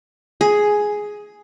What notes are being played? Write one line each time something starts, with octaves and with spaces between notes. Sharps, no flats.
G#4